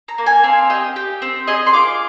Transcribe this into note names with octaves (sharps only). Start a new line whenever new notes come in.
A#5
A#3
G#5
C4 F5
G4 D#5
G4
C4
G#4 D#5
C6
F4 D6